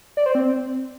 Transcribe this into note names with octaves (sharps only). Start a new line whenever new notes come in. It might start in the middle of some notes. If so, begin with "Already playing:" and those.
D5
C5
C4